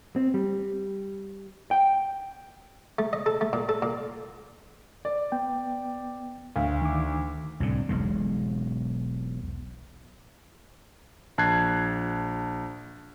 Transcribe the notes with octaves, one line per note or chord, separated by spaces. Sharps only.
C4
G3
G5
A3
D#5
A4
A3
A#2
A4
A#2
D5
B3 G5
D2 F5
D#3 D6
C2 A2 D3
E1 B1 B2 G#3
A#1 A5 F#6 G#6 C7